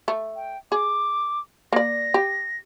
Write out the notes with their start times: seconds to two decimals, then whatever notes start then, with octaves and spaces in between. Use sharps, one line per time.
0.08 A3
0.35 G5
0.72 G#4 D6
1.73 A#3 D5 A#6
2.14 G4